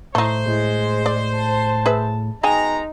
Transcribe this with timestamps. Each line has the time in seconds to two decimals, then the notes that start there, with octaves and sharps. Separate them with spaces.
0.15 A2 A3 D#4 C5
0.46 A2 G#3
1.06 D5
1.36 A5
1.86 G#4 B4 E5
2.43 B2 G#3 D#4 G#4 G5 G#5 A#5